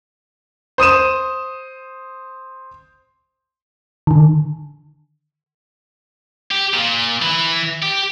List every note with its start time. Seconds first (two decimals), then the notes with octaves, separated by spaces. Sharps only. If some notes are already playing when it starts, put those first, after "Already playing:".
0.78 C5 D#6 D#7 E7
4.07 D3 D#3
6.51 G4
6.74 A#2
7.22 E3
7.83 G4